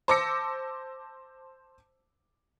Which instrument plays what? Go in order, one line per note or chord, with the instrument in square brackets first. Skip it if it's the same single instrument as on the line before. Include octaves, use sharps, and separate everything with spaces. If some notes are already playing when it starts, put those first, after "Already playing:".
[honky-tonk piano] C5 A5 D6 E6 A#6 C#7